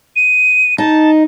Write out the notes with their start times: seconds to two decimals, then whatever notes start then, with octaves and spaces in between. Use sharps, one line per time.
0.16 D#7
0.78 D#4 A5